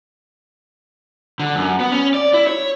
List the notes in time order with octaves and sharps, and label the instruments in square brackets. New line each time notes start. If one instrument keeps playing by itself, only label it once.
[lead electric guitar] D3
F#2
B3
C#4
D5
E4
C#5